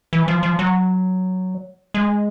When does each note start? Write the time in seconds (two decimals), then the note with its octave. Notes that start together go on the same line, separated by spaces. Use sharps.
0.13 E3
0.28 F3
0.43 F3
0.59 F#3
1.94 G#3